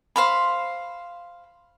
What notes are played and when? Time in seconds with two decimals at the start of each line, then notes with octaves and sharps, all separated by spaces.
0.16 C5 F5 B5